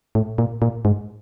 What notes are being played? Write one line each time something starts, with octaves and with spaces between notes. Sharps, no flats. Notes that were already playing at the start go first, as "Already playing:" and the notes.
A2
A#2
A#2
G#2